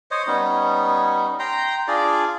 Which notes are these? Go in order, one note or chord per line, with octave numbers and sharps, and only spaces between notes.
C5 C#5 D#5
G3 B3 C#4 D#4
G5 A#5 C6
D4 F4 G#4 D5